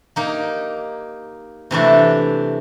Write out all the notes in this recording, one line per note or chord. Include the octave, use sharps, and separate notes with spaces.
A#3 D#4 G4
C3 E3 A3 D4